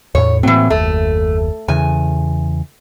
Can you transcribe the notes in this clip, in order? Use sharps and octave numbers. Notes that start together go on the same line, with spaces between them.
E2 A2 C#5
A2 E3 F#3 A#3 C4
F#1 D#2 A3
E2 C#3 G#5